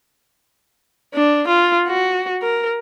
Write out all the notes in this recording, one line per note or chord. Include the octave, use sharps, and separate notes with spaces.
D4
F4
F#4
A#4